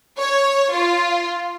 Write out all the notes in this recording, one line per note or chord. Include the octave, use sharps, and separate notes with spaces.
C#5
F4